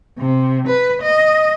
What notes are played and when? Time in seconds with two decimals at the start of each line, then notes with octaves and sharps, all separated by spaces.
0.18 C3
0.67 B4
1.02 D#5